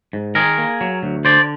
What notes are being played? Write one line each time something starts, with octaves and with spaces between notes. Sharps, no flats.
G#2
D#3 G#4 A#4
A#3
F#3
D2
D3 C5 D5